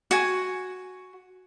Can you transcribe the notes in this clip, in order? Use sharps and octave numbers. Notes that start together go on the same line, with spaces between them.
F#4 G#5